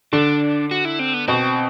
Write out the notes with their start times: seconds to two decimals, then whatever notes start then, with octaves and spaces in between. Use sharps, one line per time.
0.13 D3 D4
0.71 F#4
0.85 E4
0.99 C4
1.14 B3
1.28 B2 C4